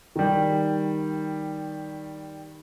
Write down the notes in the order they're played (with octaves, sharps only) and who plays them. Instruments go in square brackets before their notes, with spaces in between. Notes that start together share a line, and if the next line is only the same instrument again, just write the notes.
[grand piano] D#3 G3